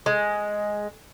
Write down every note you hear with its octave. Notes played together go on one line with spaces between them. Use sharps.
G#3